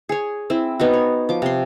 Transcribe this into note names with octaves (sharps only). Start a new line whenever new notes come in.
G#4 C#5
C4 E4
B3 D#4 F#4
C#5
F3 D6
C3 C6